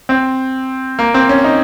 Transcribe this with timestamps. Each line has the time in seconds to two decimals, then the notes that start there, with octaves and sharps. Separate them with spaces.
0.09 C4
0.99 A#3
1.14 C4
1.29 C#4
1.44 D#4